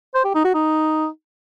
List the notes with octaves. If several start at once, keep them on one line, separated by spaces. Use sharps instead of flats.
C5
G4
D#4
F#4
D#4